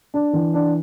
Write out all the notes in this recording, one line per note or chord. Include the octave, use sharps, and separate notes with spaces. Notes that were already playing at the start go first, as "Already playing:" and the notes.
D4
E3
D4